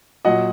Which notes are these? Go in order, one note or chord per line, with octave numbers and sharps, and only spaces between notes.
A#2 F#3 D#5 F#5